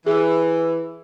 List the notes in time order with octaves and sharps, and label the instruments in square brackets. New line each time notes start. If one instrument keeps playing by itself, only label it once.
[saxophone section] E3 [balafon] G#4